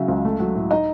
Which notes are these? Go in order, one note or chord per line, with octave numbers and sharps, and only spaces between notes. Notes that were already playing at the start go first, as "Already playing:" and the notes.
Already playing: C#3 F#3 E5
C#2
A3
F#3
A2
D#4 D#5